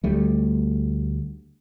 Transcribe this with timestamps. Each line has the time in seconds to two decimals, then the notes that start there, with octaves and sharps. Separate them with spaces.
0.04 D2 G3 A3